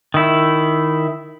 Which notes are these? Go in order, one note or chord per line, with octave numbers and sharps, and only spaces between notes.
D#3 E4